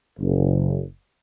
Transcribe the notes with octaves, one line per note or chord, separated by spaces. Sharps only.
F#1